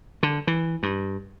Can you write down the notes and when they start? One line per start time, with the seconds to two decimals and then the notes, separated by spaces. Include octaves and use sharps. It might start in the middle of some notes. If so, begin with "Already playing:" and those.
0.23 D3
0.47 E3
0.83 G2